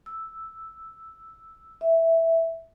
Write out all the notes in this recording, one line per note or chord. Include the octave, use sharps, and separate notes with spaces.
E6
E5